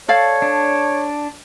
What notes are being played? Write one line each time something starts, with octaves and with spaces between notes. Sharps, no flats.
A4 C#5 D5 F5
D4